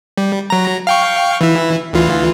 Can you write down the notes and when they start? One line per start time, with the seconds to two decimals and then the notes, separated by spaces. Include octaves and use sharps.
0.18 G3
0.50 F#3 A#5
0.87 F5 G5 C#6
1.41 E3 E4
1.93 D2 E3 F4